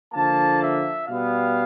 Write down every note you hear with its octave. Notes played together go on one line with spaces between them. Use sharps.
D3 F3 A#3 A5
E5
B2 G3 B3 F5